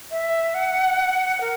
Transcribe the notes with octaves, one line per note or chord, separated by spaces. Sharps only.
E5
F#5
A#4